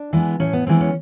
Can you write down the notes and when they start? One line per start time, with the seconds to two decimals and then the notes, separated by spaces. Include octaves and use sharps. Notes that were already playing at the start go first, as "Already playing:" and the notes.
Already playing: D4
0.13 E3 G#3 B3
0.40 A2 C#4
0.53 B3
0.67 E3 G#3 B3 C4
0.80 C#4